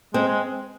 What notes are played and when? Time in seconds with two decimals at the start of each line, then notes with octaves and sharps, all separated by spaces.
0.14 G#3 C4
0.27 G#3